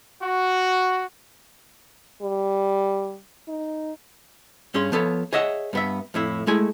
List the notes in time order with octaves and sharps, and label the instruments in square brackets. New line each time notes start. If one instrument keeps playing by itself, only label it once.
[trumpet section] F#4
[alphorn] G3
D#4
[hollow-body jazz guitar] G2 C#4 G#4 C6
F3 B3 A4 C#5
G#4 C#5 D#5 E5 F#5
G2 B3 E5
F2 A2 E4
G#3 A3 E4 G#5